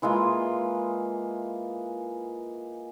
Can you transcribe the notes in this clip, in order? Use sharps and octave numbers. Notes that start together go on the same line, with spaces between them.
E3 G#3 A#3 F4